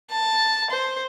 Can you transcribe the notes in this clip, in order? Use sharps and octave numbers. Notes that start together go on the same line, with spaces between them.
A5
C5